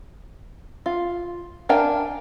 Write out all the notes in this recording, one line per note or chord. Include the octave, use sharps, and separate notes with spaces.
F4
D4 A#4 F5 G5 G#5